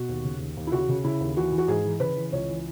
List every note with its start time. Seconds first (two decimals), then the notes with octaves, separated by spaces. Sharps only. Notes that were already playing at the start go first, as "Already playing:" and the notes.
Already playing: B2 F#4
0.09 D#2
0.24 C#3
0.40 D#2
0.57 D#2
0.67 E4
0.72 C#3 F#4
0.89 C#3
1.04 C#3 E4
1.20 D#2
1.36 E3 F#4
1.52 E3
1.58 F#4
1.68 G#2 G#4
1.84 E3
2.00 C#3 B4
2.16 E3
2.32 C#2 C#5
2.49 E3